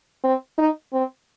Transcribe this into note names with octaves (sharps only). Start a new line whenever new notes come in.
C4
D#4
C4